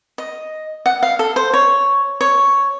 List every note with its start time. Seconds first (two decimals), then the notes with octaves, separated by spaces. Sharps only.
0.18 D#5
0.86 F#5
1.03 F5
1.19 A4
1.36 C5
1.54 C#5
2.21 C#5